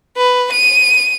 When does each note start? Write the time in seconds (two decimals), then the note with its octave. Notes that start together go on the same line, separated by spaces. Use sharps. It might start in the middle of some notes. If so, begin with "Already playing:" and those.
0.17 B4
0.52 D#7